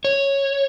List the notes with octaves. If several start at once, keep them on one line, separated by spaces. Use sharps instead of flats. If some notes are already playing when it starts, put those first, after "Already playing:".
C#5